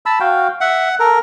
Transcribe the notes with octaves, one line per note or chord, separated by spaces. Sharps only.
A5 B5 E6
F#4 F5 G5
E5 F#5
A4 A#4